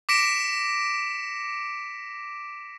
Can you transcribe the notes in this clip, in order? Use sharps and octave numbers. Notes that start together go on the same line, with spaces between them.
D6 A#6 B6 C#7 D7 E7